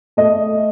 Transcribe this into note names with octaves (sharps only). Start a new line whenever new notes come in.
A3 D#5